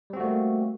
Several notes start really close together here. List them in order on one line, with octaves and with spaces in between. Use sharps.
G3 C4 F#4 A3 A#3